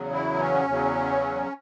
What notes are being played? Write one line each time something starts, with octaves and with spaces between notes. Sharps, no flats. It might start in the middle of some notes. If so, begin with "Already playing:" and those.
Already playing: E2 C#3 F#3
E4
C#4
E2 C#3 F#3